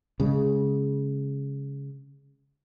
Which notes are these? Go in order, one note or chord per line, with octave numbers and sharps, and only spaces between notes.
C#3 G#3